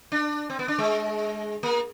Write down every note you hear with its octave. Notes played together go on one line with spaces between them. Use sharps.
D4
C4
B3
D4
G#3
A#3